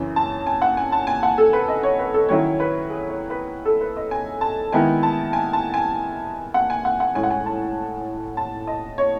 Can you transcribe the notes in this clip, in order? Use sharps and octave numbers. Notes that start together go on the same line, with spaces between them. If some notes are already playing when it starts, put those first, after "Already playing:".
Already playing: F#2 C#3 E3
A5
G#5
F#5
G#5
A5
G#5
F#5
A4
B4
D#5
C#5
B4
A4
D#3 F#3 C#4 E4 C#5
B4
G#4
C#5
B4
A4
B4
D#5
G#5
A5
D#3 G#3 B3 E4 G#5
A5
G#5
A5
G#5
F#5
G#5
F#5
F#5
A2 G#3 C#4 G#5
F#5
G#5
A5
A5
D#5
C#5